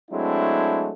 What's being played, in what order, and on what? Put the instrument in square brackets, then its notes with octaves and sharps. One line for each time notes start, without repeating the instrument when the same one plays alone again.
[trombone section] F#3 G#3 A3 C4 D4 E4